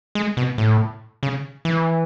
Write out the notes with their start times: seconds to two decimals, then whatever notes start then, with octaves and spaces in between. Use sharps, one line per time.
0.15 G#3
0.37 B2
0.58 A2
1.23 C#3
1.65 E3